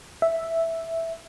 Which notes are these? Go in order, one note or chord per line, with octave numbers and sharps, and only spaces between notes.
E5